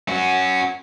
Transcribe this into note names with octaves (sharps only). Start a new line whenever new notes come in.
C#4 F#4